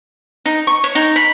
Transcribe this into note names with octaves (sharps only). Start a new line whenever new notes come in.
D#4
C#6
C#5
D#4
B5